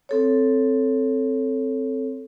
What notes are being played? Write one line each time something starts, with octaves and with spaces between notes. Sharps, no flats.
C4 A4 C#5